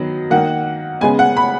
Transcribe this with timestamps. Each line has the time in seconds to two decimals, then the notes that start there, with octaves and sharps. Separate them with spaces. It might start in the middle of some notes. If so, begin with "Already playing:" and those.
Already playing: D#3 F#3 B3
0.30 D#3 A#3 F#5
1.01 C#3 G#3 B3 G#5
1.19 F#5
1.37 B5